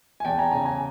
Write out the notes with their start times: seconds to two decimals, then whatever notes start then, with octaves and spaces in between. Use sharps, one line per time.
0.20 G#5
0.25 E2 G5 A5
0.38 G#5 A#5
0.51 C#3 G#5 A#5
0.65 G#5 A#5